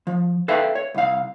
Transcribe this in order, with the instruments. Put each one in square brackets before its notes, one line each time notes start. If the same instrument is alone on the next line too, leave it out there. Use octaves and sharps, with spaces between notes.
[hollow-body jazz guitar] F3
A4 B4 E5 F5 G5 A5
C#5
C2 F5